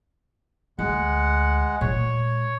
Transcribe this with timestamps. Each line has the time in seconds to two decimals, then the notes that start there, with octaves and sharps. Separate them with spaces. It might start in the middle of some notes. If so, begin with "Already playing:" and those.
0.79 D2 G#3 F#5
1.81 A#2 G#3 C#5